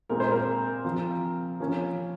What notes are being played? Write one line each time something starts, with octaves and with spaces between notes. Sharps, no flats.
A#2 G#3 C4 A#4
C5
A#4
F3 C4
F3 A#3 C#4